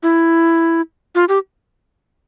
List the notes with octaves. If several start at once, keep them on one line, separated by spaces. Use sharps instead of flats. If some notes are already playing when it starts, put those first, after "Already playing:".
E4
F4
G4